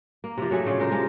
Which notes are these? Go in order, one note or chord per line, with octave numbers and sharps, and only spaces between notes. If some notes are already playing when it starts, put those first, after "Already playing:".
A#3
C3 F3
F#3 A3 G#4 E5
A#2 C#3 F5
G#3 A4 A#4 C5
C3 G#3 F4